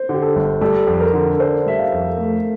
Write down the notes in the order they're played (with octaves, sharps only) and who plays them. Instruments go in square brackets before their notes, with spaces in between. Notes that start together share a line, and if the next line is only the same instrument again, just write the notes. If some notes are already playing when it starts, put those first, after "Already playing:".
Already playing: [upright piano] C5
[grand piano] D3 [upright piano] G4
[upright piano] A4
[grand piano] G1
[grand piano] G3 [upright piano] A4
[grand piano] F2
[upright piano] A#4
[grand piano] D3
[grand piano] D4 [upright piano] C5
[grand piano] G3 [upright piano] E5
[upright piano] F5
[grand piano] F2
A3